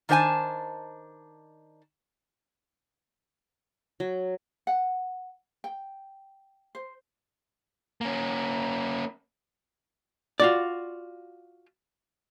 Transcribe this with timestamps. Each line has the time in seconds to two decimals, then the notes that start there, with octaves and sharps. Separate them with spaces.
0.09 D#3 D4 C5 E5 G#5 A5
4.00 F#3
4.67 F#5
5.64 G5
6.75 C5
8.01 A#3 C#4
10.40 F4 F#4 D5